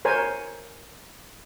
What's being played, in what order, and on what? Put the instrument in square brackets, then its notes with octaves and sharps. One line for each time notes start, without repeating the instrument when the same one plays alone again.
[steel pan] A#4 C5 C#5 G#5